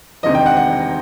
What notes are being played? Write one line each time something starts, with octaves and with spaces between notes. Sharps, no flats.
E1 D2 C3 D#3 D#5
G5
F#5
F#5